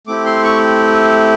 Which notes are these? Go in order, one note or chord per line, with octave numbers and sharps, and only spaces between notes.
A3 C4 E4 G4 D6
C6
C#6